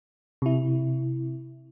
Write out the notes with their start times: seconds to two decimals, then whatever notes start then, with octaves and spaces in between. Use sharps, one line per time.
0.42 C3 E4